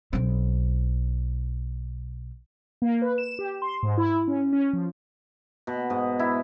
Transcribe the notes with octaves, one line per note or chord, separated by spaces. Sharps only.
B1 C4
A#3
B4
E7
G4
C6
G#2
E4
C#4
C#4
F3
B2
G#2
E4